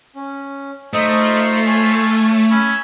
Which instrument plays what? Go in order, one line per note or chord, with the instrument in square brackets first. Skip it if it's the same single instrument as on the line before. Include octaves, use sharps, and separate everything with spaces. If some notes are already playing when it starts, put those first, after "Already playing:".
[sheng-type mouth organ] C#4
[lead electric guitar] A3 [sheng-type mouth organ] D#4 C5 D#5 [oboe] D#6
[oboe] F4
[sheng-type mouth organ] C#5 G#5
[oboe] C#4 [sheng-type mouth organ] B5 E6